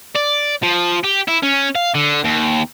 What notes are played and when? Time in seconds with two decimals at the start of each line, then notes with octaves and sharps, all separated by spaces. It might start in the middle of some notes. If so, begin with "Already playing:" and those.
0.16 D5
0.63 F3
1.04 G4
1.28 E4
1.43 C#4
1.75 F5
1.94 D3
2.24 D#2